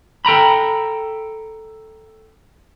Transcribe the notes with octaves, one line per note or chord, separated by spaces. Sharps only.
A4 G5 A#5 B5